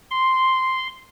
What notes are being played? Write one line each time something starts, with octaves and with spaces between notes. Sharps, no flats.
C6